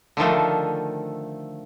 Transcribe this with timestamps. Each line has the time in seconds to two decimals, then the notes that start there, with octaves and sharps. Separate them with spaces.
0.17 D3 D#3 F3 A3